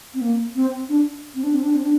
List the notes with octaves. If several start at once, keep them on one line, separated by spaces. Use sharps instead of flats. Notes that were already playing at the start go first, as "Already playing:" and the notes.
C4
A#3
C4
D4
C4
D4
C4
D4
C4
D4